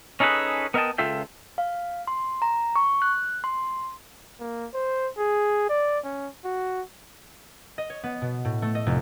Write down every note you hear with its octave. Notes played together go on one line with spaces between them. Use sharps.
C#4 D#4 G#4 A4 B4
B3 A#4 D#5 E5 G5 A5
C#2 F4 A4 E5 G5
F5
C6
A#5
C#6
F#6
C6
A#3
C5
G#4
D5
C#4
F#4
D#5
C#5
B3
B2
A2
A3
D#5
F1